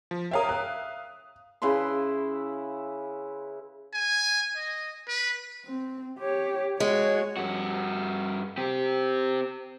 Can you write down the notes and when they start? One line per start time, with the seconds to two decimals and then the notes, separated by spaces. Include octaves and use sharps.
0.11 F3
0.31 A#4 C#5 E5 F5 G5 D#6
0.49 F#6
1.62 C#3 E4 B4 C6
3.93 G#5
4.57 D#5
5.08 B4
5.66 C4
6.19 G4 C#5
6.80 G#3 F#4 C#5
7.37 G2 F#4
8.58 C4 G4